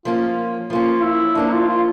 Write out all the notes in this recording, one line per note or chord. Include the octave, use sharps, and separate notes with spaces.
F3 A#3 C#4 F4
F3 A#3 C#4 F4
E4
F3 A#3 C#4 D4
F4
F4